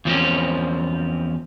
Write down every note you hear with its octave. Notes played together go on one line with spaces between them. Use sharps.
E2 F3 C4 C#4